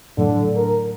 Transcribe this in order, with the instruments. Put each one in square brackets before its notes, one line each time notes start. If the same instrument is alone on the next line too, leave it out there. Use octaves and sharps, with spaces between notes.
[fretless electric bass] A2 F#3 A3 [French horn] D3
[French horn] A#4